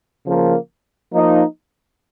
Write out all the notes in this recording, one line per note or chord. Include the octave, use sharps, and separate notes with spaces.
C#3 F3 A#3
F3 A#3 D#4